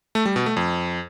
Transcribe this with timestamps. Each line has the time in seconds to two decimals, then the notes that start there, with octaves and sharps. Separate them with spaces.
0.15 A3
0.25 G3
0.36 B2
0.46 A3
0.57 F2